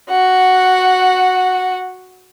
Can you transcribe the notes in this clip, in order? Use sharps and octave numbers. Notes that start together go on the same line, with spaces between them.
F#4 F#5